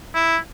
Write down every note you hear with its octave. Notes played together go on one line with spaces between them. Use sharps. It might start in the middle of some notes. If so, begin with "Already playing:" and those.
E4